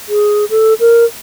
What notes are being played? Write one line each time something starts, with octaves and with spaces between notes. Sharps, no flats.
G#4
A4
A#4